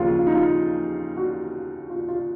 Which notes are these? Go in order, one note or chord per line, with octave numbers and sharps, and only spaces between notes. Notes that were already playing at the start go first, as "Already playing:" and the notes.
Already playing: D#2 C#3 F3 F4
F4
D#4
F4
F#4
F4
F4